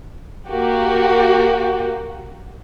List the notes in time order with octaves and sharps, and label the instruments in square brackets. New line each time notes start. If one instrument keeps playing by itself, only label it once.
[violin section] A#3 F#4 G4